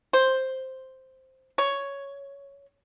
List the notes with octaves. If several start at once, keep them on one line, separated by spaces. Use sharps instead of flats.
C5
C#5